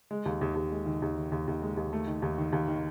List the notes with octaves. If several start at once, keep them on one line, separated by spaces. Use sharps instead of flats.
G#3
D#2
D#2
D#2
G#3
D#3
D#2
D#3
D#2
D#2
G#3
D#2
A3
D#3
D#2
D#3
D#2
D#3